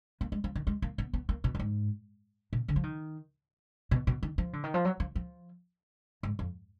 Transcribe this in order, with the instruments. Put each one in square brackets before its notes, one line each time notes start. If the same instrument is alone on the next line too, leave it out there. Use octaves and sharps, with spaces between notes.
[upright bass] A#3
G#3
F3
D#3
G#3
A#3
B3
B3
A#3
B2
F#2
G#2
B2
D3
F3
D#3
B2
B2
D#3
F3
D3
D#3
F3
F#3
F3
F3
G#2
F2